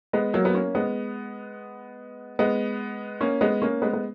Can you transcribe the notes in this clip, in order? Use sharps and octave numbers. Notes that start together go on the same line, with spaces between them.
G#3 B3
F#3 A#3
B3
A#3 C#4
G#3 B3
G#3 B3
A#3 C#4
G#3 B3
A#3 C#4
G#3 B3
B3